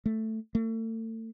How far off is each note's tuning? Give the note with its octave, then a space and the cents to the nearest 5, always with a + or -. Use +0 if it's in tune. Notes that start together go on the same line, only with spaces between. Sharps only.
A3 +5
A3 +35